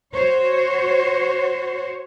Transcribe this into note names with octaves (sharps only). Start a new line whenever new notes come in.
F#4 C5 C#5